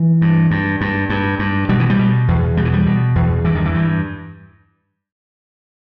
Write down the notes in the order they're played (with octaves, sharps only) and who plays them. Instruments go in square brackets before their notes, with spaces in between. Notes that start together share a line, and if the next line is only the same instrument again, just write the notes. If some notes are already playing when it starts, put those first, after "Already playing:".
Already playing: [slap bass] E3
G2
G2
G2
G2
G2
B2 G3
E3
G3
B2
E2
B2 G3
E3
G3
B2
E2
G2 E3
D#3
E3
G2